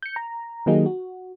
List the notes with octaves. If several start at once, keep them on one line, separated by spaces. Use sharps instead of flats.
G6 C#7
A#5
D#3 F#3 A#3 D#4 G4 G#4
F#4